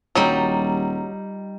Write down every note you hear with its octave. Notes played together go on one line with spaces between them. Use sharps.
D#1 F#3 G3 D#4 F4